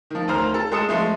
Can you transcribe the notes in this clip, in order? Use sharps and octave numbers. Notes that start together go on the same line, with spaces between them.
D#3 F3
D2 D#3 C5 A#5 F6
A4
G#3 A4 D#6 C#7 E7
F3 G#3 A3